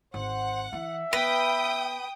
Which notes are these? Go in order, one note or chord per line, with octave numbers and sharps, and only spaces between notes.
G#1 C5 F#5
E3 E5
B3 B4 G5 D#6